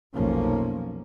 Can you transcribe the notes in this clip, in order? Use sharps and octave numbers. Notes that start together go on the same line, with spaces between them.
F1 B1 F3 A#3 C#4